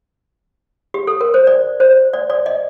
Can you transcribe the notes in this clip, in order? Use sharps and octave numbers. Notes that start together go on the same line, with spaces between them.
G4
A4
A#4
C5
D5
C5
D5
D5
D#5